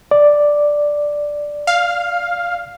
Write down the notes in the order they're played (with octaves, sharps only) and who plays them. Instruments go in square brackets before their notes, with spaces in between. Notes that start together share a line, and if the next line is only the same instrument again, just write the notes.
[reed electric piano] D5
[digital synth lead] F5